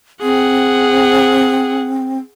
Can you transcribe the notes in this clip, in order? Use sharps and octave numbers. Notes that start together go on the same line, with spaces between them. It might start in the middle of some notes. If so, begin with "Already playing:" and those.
C4 G#4 F#5